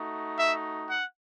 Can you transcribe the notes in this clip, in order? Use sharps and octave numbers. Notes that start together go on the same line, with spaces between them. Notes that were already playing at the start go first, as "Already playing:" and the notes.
Already playing: A3 D#4 F#4
E5
F#5